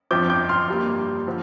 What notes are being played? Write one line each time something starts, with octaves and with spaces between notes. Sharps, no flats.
G1 F2 F3 D6 G6
D6 G6
C6 F6
G2 G3 A#3
D3 F3